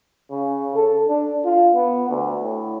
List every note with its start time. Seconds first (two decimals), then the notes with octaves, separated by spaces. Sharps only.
0.31 C#3
0.76 A4
1.09 D4
1.45 F4
1.75 B3
2.09 D2
2.42 A2